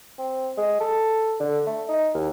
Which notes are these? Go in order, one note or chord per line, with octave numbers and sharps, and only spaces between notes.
C4
G#3
A4
D3
A3
D#4
D#2